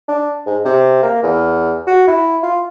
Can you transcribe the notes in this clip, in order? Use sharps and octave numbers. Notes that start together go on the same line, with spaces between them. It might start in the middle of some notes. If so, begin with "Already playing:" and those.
D4
G#2
C3
A#3
E2
F#4
E4
F4